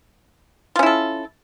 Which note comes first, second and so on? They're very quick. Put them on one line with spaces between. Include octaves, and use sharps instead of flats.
F4 C#4 E4 A4